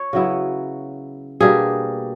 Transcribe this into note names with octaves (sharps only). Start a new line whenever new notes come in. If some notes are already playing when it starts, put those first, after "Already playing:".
Already playing: C#5
C#3 F#3 B3 E4
B2 G3 A#3 D4 G#4